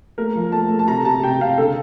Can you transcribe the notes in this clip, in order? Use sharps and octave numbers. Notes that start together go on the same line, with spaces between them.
A3 A#4
F3
A3 A5
A3
A5
C3 A#5
C3 A5
C3 G5
C3 F5
D3 A4